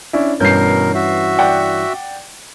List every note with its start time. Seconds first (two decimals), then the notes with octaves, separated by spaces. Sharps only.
0.13 C#4 D4 E4
0.40 G2 B2 E3 C#4 A#4 G6 C7
0.94 F#4 E5
1.39 D5 F#5 G5